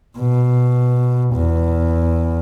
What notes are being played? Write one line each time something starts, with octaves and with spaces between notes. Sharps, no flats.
B2
E2